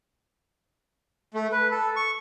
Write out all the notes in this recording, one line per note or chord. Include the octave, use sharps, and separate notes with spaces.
A3
B4
A4
C#6